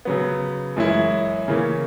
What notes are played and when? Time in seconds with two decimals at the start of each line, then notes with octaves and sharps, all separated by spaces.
0.05 C#3 F#3 B3
0.76 F#2 E3 G#3 C#4 E4
1.48 C#3 E3 A#3 C#4